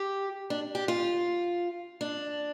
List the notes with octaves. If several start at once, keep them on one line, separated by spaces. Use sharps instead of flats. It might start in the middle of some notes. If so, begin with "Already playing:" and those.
Already playing: G4
D4
G4
F4
D4